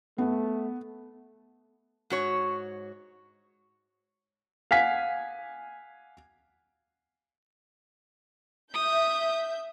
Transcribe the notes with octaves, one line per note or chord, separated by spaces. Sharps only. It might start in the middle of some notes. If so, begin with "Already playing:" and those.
A3 B3
G#2 F#4 C#5
F5 F#5 G#5 B6
E5 D#6 G6